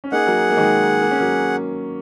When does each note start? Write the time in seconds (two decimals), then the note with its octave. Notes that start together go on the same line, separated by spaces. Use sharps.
0.04 C#4
0.12 A#3 D#4 G#4 F#5
0.26 F#3 A#3
0.51 A#3
0.57 D#3 G#3
1.02 A#3
1.11 C#4
1.20 F#3 A#3